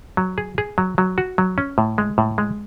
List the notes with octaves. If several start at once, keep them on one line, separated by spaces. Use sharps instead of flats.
F#3
G#4
G#4
F#3
F#3
F#4
F#3
C#4
A2
G#3
A2
G#3